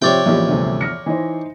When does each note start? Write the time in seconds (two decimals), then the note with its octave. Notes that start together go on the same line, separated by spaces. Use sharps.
0.02 C3 F3 C#5 D5 G5
0.26 A1 E2 F3 A#3 G4
0.48 D2 G2 C3
0.81 F6 A#6 C#7
1.06 E3 D#4 C5